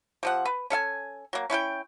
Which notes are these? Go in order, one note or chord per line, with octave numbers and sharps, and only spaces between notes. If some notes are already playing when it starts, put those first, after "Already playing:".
C3 F3 F#5
B4
C#4 A4 E5 G#5
F#3 A#3
C#4 E4 B4 G5